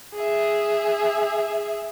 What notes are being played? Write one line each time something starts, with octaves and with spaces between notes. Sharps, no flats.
G#4 E5